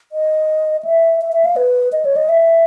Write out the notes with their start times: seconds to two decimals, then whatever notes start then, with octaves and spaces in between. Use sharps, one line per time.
0.12 D#5
0.85 E5
1.21 E5
1.32 E5
1.45 F5
1.56 B4
1.92 D#5
2.05 C#5
2.16 D#5
2.29 E5